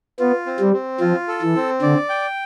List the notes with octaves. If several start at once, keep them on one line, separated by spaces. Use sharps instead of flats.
B3 F4
C4
G3
C4
F3 F4
A4
E3
C4
D3 D5
G5